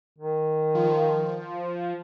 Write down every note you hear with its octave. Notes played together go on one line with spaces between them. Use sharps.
D#3
F3